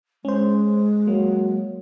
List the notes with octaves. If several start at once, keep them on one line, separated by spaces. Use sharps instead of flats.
G#3 C#4 C5
F#3 A#3